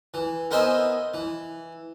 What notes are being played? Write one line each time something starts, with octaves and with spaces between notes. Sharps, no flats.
E3
B3 A#4 C5 D#5 E5 G#5
E3